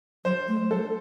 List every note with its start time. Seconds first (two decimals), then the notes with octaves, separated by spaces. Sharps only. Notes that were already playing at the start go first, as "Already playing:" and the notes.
0.24 F#3 C5
0.48 A3
0.71 F#3 A4